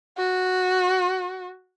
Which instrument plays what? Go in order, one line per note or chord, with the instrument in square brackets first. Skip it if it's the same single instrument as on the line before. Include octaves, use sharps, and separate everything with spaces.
[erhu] F#4